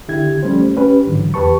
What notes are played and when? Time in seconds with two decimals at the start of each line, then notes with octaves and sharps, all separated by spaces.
0.08 D3 E4 G4 G#6
0.43 F3 G3 A3 C#4 C5
0.77 C#4 G4 B4
1.07 G#2 D3 E3 F#3
1.34 E2 G4 B4 A5 C#6